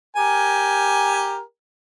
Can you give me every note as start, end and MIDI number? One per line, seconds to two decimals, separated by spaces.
0.17 1.40 67
0.17 1.40 70
0.17 1.40 80